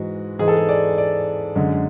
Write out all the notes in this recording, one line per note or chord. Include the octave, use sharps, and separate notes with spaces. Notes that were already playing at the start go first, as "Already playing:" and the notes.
Already playing: G#2 E3 G#3 F#4
G#2 E3 G#3 G#4
A4
G#4
D5
D5
F#2 D3 G#3